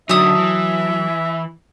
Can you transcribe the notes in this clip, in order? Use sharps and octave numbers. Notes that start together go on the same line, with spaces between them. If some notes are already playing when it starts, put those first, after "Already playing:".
D3 F#3 A3 D#4 E5 A5 D#6
E3